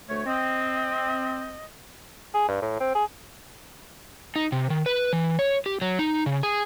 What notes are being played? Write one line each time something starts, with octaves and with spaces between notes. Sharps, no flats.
D2 A3 C#5
C4 D#5
G#4
G2
A2
C4
G#4
D#4
C3
D#3
B4
E3
C#5
G4
F#3
D#4
C#3
G#4